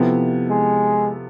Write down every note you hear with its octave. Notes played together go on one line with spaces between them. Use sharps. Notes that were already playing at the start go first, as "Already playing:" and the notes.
Already playing: C3 F3 B3 E4 A4
G#3